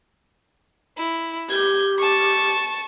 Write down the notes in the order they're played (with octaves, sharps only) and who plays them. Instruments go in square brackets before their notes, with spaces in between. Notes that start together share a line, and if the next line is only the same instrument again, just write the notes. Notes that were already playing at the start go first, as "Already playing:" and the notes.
[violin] E4
[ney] G4 [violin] G6 G#6
[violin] A5 C#6